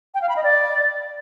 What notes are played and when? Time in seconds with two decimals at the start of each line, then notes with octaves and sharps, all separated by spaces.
0.14 G5
0.22 F5
0.29 B5
0.36 D#5
0.44 D5